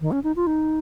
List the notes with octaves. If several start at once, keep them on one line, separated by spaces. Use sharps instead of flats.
D#3
C#4
D#4
F4
D#4